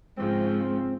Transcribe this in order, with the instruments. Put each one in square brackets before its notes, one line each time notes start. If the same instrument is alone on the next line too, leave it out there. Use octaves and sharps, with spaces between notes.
[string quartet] G#2 C#3 F3 [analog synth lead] C4